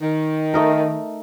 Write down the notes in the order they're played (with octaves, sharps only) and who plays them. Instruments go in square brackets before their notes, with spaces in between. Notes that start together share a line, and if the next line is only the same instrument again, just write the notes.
[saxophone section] D#3
[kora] A3 D#4 A#4